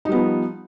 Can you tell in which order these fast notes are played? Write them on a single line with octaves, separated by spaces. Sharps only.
D#4 G3 B3 F3